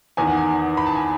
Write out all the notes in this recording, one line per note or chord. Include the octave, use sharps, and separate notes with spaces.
E2 D#3 G#5
F#5
G#5
B5
A5
G#5